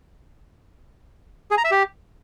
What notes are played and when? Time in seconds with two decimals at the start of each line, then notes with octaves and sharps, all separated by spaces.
1.51 G#4
1.58 A#5
1.64 E5
1.71 G4